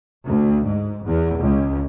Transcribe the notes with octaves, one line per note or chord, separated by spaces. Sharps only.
D2
G#2
E2
C#2